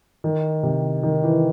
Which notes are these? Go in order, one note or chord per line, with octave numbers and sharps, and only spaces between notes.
D#3
C3
D#3
E3